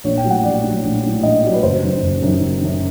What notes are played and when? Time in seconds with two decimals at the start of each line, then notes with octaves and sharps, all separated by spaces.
0.04 A#1 C#5
0.17 G5
0.23 A2 F#3
0.30 F#5
0.43 A#1 D5
0.64 A2 F#3
0.83 A#1
1.03 A2 F#3
1.23 A#1 D#5
1.43 A2 F#3 D5
1.54 B4
1.63 F#1 C5
1.82 F#2 D#3
2.02 F#1
2.22 F#2 D#3
2.41 F#1
2.62 F#2 D#3